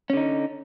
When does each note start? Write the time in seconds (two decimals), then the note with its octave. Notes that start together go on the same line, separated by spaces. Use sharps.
0.10 C#4
0.13 D3
0.17 D#4